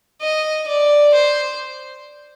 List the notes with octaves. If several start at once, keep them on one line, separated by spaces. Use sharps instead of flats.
D#5
D5
C5